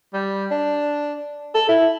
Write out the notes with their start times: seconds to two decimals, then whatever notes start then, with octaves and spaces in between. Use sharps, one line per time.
0.14 G3
0.51 D4
1.55 A4
1.68 E4